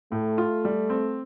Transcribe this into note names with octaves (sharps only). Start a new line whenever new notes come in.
A2 A3
F4
G3
C4